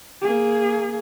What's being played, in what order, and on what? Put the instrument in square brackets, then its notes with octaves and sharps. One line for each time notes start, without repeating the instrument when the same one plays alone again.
[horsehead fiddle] A#3 G#4